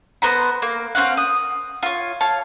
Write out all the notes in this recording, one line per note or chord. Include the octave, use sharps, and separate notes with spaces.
B3 C5 A#5 B5
A#3
C4 C#4 F5 F#5
D#6
F4 C#5
C#5 F5 A5